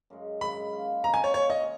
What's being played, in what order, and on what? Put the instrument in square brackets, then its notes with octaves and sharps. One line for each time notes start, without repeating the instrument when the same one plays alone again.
[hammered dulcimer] F#2 C#3 G#3
[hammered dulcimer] F#2 C#3 G#3 [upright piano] B5
[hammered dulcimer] D#3 A#3 F4
[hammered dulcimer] D#3 A#3 F4 [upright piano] A#5
[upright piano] G#5
C#5
[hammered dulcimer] D#3 A#3 F4 [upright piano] C#5
[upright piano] D#5